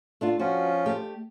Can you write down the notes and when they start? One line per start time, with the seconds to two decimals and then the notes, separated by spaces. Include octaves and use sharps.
0.21 A3 D4 F4
0.39 F3 C#4 F4 F#4
0.86 A3 G4